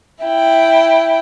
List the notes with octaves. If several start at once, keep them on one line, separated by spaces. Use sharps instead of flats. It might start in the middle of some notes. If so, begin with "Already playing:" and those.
E4 G5